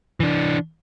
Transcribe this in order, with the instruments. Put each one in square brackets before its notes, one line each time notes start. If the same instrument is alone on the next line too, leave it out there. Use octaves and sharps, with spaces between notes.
[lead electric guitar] E3 D4